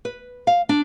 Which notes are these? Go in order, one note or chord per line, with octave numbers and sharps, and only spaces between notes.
B4
F5
D4